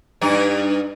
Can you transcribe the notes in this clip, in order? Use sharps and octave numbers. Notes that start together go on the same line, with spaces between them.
G2 D#4